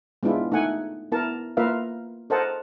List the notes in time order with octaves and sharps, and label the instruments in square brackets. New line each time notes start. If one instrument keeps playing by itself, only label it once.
[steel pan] G#3 B3 D4 E4 F4
A3 D#4 F#5 G#5
B3 E4 A#4 A5
A#3 F4 A#4 B4 E5 F5
A4 A#4 C5 D#5 F#5 A5